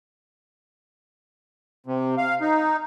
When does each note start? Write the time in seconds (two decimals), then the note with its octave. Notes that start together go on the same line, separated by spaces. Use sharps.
1.86 C3
2.18 F5
2.41 D#4